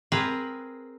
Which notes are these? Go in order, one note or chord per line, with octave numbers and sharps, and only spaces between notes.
C4 G#4 A#4 B4